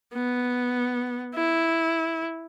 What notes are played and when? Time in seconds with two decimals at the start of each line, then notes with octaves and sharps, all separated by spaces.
0.14 B3
1.35 E4